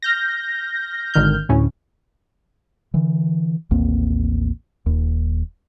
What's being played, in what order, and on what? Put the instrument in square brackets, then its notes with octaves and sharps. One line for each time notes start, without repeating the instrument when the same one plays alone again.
[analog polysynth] F6 G6 A#6
G#1 D3 D#3 F6 G6
D2 A2 C#4
[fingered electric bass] D3 E3
A1 D#2 A#3 C4
D#1 D#2